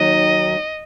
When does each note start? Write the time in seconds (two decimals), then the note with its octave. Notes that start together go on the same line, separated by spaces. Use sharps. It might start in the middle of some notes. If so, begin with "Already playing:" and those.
Already playing: D#2 D#3 F#3 D#5